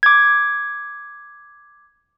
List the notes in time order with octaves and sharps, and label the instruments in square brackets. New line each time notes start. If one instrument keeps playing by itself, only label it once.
[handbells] D6 G#6